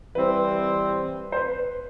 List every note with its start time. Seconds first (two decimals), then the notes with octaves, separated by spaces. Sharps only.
0.15 E3 G3 C4 B4
1.32 C5
1.37 B4